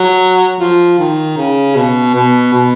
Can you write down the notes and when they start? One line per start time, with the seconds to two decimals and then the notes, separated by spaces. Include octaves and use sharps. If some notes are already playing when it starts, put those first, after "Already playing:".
Already playing: F#3
0.60 F3
0.99 D#3
1.37 C#3
1.75 B2
2.14 B2
2.53 B2